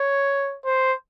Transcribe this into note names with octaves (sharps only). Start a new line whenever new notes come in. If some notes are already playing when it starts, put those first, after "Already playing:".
Already playing: C#5
C5